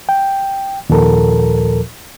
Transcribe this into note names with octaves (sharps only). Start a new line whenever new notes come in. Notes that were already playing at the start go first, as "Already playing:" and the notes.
G5
D#2 A#2 F3 A4 A#4